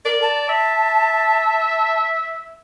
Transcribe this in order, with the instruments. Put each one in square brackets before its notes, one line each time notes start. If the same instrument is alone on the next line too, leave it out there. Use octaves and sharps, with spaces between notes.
[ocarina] A#4 [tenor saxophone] D5
[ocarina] A5
[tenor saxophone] E5